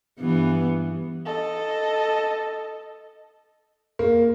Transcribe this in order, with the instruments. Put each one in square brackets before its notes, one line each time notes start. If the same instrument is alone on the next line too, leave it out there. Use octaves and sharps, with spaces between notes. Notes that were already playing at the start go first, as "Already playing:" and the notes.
[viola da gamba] G2 E3 B3
[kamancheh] A4 D#5
[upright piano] A#3